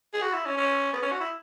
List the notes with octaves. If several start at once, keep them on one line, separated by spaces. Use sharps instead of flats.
G#4
F#4
E4
C#4
C#4
B3
C#4
F#4
E4